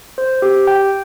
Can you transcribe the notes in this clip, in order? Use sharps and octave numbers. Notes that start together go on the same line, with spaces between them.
C5
G4
G5